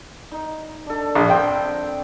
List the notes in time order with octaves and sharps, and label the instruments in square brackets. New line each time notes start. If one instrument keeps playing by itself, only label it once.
[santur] D#4
D4 A4
[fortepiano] A#1
[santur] C4 C5 [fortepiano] G5